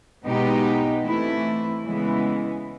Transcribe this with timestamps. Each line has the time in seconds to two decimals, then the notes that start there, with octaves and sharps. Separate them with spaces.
0.25 B2 G#3 B3 D#4 G4
1.04 E3 A3 C4 E4
1.83 C#3 E3 G#3 B3 E4